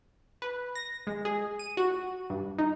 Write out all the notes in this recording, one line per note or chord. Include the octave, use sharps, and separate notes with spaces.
B4
A#6
G#3
G#4
D#7
F#4
G2
D#4